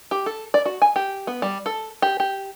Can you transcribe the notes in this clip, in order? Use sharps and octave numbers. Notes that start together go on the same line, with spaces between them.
G4
A4
D5
F#4
G#5
G4
B3
G3
A4
G4
G4